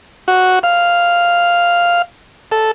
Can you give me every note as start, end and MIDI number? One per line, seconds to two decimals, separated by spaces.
0.28 0.59 66
0.63 2.02 77
2.52 2.71 69